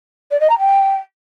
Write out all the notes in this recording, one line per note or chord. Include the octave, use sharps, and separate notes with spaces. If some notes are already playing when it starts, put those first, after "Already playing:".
D5
D#5
A#5
G5